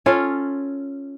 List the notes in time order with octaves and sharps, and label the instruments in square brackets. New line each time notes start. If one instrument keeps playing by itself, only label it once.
[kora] C#4 F4 A4